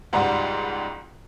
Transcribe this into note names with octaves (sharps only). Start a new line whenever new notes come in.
C#2 G#2 G3 F#4